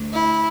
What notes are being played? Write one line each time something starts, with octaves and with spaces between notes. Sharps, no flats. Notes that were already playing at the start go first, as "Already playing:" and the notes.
Already playing: D2
E4